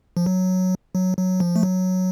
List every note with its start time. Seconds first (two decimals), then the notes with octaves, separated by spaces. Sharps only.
0.17 F3
0.26 F#3
0.95 F#3
1.18 F#3
1.40 F3
1.56 A3
1.63 F#3